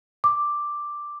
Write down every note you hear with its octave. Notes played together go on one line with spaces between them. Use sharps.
D6